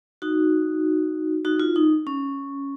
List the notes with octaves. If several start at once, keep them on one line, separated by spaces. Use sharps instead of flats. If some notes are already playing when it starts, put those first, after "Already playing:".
D#4 F#4
D#4 F#4
F4
D#4
C#4